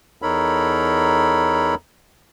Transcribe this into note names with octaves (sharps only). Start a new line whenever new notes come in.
E2 D#4 A4 A#4 C#5 B5